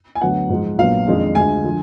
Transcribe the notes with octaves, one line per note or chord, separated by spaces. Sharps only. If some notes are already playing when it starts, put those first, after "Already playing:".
G#5
D2 D3 F#3 B3 F#5
G#2 F3 G#3
A#1 A#2 F#3 B3 F5
F2 D#3 G#3 D4
D2 D3 G#3 G#5
D3 F3